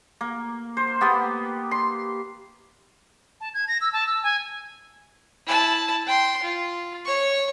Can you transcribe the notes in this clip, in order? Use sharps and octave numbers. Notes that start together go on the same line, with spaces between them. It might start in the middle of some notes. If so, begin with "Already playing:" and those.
A#3
C5
A#3 B3 G4
C6
A5
G#6
A#6
E6
A5
E6
G#5
E4 A5
G5 C6
F4
C#5 C#6